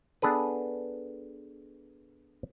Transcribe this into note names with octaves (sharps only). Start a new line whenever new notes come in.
B3 D4 G#4 A4 B4